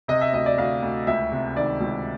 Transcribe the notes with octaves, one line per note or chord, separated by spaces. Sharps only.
C3 D#5
E5
D2 D#5
D5
D2 F5
D2
C#2 E5
C3
D#3 D5
C#2